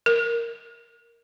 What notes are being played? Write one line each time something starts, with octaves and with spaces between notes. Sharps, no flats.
A#4